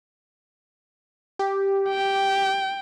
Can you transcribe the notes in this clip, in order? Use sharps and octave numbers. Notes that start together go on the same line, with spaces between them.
G4
G5